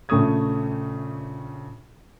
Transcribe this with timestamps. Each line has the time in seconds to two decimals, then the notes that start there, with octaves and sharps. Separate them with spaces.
0.09 A#1 C#3 A3 C#6 D#6 G#6